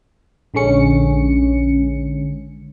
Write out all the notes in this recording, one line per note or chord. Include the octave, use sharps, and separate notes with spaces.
A#1 D3 G#3 C#4 C#7